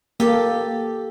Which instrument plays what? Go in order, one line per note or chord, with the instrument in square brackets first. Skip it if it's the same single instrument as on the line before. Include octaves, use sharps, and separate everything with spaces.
[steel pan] A#3 [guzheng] G4 A4